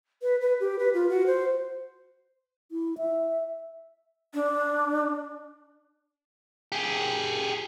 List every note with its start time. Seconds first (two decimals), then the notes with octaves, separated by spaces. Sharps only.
0.22 B4
0.41 B4
0.60 G4
0.79 B4
0.94 F4
1.09 F#4
1.26 C5
2.72 E4
2.98 E5
4.34 D4
6.72 G4 G#4